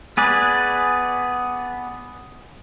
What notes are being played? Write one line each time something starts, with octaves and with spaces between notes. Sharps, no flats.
B3 G#4 B4 D5